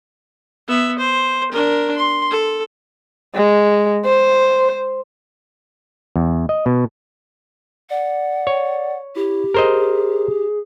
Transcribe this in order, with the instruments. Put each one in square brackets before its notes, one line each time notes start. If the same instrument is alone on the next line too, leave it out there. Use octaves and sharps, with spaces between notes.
[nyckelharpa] B3 E5
C5
D4 A#4
C6
A4
[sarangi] G#3
C5
[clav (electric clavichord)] E2
D#5
B2
[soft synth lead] D5 [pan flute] F#5
[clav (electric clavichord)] C#5
[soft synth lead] E4 [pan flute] G4
[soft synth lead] G#4 [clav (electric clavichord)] A#4 C5 D#5